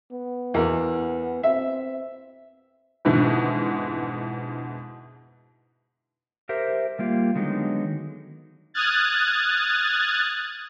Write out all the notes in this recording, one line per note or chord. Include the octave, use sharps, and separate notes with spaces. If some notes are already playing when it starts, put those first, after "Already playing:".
B3
E2 A#4
C4 E5
F2 G#2 B2 D3 E3 F3
G4 A#4 C5 E5
G3 A#3 F4 G4
D3 D#3 F#3 G#3 B3 D#4
D#6 F6 F#6 G#6 A6